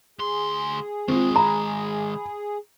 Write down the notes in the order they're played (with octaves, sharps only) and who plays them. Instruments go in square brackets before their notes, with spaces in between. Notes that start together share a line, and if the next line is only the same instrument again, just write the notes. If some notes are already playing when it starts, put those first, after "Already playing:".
[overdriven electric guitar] D2 C6 [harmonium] G#4
[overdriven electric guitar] D#3 G#3 [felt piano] C4 F4
[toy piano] A#5 [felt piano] B5